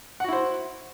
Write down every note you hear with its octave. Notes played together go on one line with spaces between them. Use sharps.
E4 F#4 C5 F#5